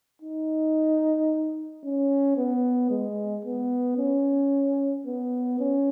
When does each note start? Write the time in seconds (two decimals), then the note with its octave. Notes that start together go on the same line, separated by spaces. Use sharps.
0.22 D#4
1.84 C#4
2.37 B3
2.91 G#3
3.45 B3
3.98 C#4
5.07 B3
5.60 C#4